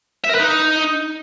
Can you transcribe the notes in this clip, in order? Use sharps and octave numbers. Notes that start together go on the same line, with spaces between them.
E5
A#4
B4
D#4